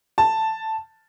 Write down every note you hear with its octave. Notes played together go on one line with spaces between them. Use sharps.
A5